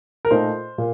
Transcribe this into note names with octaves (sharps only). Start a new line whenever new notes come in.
A#4
A#2 A3 D#4 C5
A#2